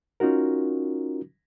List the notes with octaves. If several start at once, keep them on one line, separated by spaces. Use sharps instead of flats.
C#4 D#4 F4 F#4 A#4